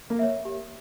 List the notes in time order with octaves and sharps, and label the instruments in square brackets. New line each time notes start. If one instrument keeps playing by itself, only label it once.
[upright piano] A#3
[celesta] C#5 E5
G4